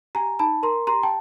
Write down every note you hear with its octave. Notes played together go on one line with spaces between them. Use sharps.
G4 G#5 A#5
D#4 A5 B5
A#4 A#5 C6
G4 A#5 C6
G5 A5